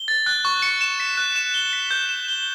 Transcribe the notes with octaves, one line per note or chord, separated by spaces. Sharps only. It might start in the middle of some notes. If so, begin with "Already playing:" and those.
Already playing: G7
A6
F#6
C#6
C#7
E7
B6
F#6
E7
G7
B6
G6
E7
G7